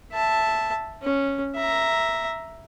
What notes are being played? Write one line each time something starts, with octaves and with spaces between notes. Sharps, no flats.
E5 A5
C#4
E5 A#5